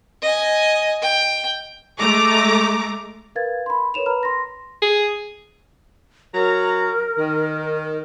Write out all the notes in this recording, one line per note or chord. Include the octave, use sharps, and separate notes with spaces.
D#5 G#5
G5
G#3 A3 A#5 D6
A#4 B4 F5 G#6 A6
B5 C6
A#4 B4 C#5 E7 F7
B4 A#5 B5 F6
C6 A#6
G#4
F#3 A#4 A#5
D#3